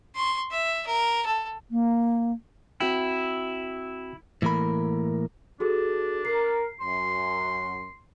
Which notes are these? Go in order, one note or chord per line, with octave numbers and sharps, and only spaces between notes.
C6 C#6
E5
A#4
A4
A#3
C4 E4 F#4 G5
A2 E3 A#3 A#4 B5
D4 F#4 G#4 A4
A#4 C7
F#2 C6